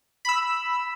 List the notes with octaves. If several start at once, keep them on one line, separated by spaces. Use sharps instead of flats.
B5 E6